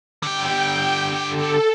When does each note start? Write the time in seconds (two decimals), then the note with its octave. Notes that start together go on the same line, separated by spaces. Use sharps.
0.23 D3 G4 G5
1.28 A4